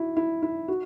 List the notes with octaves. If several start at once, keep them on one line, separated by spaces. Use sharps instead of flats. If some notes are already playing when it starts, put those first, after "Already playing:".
Already playing: E4 F#4
E4
E4
F#4